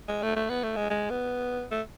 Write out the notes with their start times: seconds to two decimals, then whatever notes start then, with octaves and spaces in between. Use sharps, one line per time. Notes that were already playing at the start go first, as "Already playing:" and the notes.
0.08 G#3
0.22 A3
0.36 A3
0.49 B3
0.63 A3
0.76 G#3
0.90 G#3
1.10 B3
1.71 A3